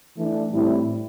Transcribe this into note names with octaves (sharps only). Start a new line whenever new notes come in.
E3 A3 D4
A2 G3 C4 E4